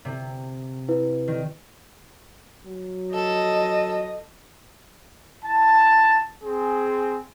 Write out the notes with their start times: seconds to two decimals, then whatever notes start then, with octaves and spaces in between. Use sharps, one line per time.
0.05 C3
0.89 E4 B4
1.28 D#3
2.66 F#3
3.14 A4 D#5
5.44 E4 A5
6.43 C4 G#4